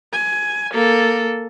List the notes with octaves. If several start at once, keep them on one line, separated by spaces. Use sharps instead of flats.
G#5
A#3 A4